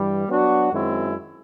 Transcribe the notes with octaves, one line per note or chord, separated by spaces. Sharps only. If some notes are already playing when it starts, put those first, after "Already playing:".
Already playing: G2 E3 G3
F#3 B3 D4 F#4
F#2 D#3 G#3 C4 E4